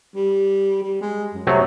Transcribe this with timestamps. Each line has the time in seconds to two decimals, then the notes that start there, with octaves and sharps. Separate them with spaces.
0.15 G3
0.82 G3
1.01 G#3
1.34 F#2
1.47 C3 F#3 G3 A3